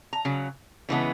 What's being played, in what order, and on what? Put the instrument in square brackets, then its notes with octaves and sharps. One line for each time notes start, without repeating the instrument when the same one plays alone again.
[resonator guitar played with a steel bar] A#5
C#3 F#3
C#3 E3 G#3 B3